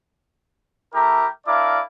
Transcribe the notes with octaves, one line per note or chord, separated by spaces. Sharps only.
A3 E4 G4 A#4 A#5
D4 E4 A#4 D5 F5 D6